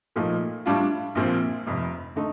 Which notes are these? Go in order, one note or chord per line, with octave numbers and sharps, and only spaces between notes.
A#2 F3 A3 D#4
A2 G3 D4 F4
A#1 A#2 F3 C4
F1 F2 C3
D3 A3 D#4